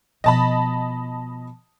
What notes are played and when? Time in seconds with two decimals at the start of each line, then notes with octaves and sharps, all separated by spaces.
0.24 B2 F3 D#5 A5 B5